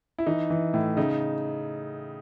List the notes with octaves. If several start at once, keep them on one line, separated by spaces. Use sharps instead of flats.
E4
E3 D#4
E3
A2
C#3 D#4